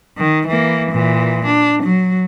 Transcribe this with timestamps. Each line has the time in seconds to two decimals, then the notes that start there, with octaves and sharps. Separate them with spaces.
0.18 D#3
0.47 E3 A#3
0.92 A#2 E3
1.46 D4
1.83 F#3